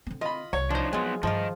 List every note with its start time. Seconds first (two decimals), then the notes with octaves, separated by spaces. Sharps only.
0.07 D3 C4
0.21 F4 D#5 B5
0.53 C2 C#5
0.70 F3 D4 D#4 C5
0.93 F#3 G#3 B3 C4 F4
1.23 G2 D3 D#3 F3 F4 D#5